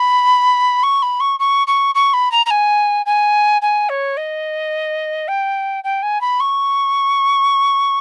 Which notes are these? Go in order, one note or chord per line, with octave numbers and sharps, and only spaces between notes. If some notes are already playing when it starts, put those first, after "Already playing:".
Already playing: B5
C#6
B5
C#6
C#6
C#6
C#6
B5
A#5
A#5
G#5
G#5
G#5
C#5
D#5
G5
G5
G#5
B5
C#6